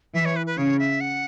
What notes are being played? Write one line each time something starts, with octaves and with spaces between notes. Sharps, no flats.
E3 E5
C#5
B4
B4
C#3 C#5
E5
F#5